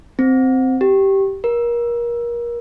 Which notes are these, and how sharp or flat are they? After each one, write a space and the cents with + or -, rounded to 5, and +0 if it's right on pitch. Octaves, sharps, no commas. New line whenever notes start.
C4 -5
G4 -10
A#4 +30